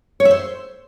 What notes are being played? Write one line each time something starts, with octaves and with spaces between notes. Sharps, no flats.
C#5
E5
C5